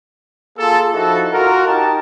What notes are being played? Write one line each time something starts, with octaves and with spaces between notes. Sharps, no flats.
A#3 F4 G#4 A4
F3 D#4 E4 F#4 A4
F4 F#4 A#4
D#4 G4 A#4 A5